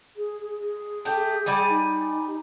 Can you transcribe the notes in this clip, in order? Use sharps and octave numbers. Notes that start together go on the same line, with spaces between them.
G#4
G#4
A3 G4
G3 D5 G#5
D#4